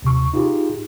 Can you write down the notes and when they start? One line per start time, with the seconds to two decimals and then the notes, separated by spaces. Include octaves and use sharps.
0.02 D#2 C3 C#6
0.34 D#4 F4 G4 G#4